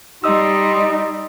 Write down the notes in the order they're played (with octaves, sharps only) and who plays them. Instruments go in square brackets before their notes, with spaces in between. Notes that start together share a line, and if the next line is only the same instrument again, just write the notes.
[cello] G3 [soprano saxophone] D#4 [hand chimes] D#5 D#6 E6 [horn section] C6